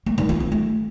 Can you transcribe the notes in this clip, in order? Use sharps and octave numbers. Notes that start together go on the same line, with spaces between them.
A#3
D#3
F4
C4
A3